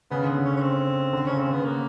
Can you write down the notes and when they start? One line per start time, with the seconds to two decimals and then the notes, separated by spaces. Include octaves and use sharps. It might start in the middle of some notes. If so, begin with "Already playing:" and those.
0.11 C#3 B3
0.24 D3
0.38 C#3
0.45 C#4
0.57 C#4
0.62 C4
1.13 D3
1.27 C#3 C#4
1.39 C4
1.47 C#3
1.52 B3
1.64 A#3